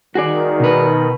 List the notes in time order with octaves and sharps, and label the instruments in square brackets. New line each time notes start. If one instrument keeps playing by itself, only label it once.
[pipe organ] D#3 [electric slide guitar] F#4 G#4 D5
[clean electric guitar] B2 B4